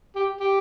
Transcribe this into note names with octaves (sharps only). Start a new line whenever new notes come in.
G4
G4